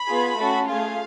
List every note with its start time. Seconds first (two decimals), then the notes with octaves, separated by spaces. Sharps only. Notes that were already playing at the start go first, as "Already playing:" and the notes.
Already playing: B5
0.09 B3 F4 G#4
0.38 A3 C#4 F#4 A4
0.68 A3 F4 G#4 F5